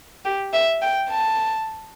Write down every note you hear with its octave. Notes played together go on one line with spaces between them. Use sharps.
G4
E5
G5
A5